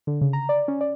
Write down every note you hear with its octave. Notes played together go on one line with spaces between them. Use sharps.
D3
C#3
A#5
D5
C#4
D5